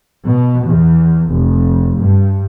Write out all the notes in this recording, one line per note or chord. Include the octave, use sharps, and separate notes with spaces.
B2
E2
F1
G2